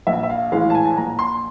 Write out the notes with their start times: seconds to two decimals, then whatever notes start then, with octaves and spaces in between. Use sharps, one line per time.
0.07 A#1 E5
0.23 E5
0.30 F5
0.52 A2 E3 G#3 F5
0.70 A5
0.75 G#5
0.86 A5
0.96 A#1 A#5
1.19 C6